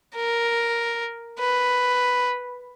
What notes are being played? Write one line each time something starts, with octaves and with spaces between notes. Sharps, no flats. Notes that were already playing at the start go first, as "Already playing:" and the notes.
A#4
B4